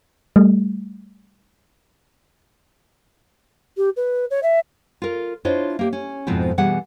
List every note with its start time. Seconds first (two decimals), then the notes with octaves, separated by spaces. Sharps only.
0.36 G3 A3
3.77 G4
3.97 B4
4.31 C#5
4.43 E5
5.02 F4 A#4
5.45 D4 E4 F4 C5 C#5 D#5
5.79 A#3 G4
5.93 C#4
6.27 F2 G#2 B2 F3 C4 E4
6.58 B2 E3 G3 G#4 F#5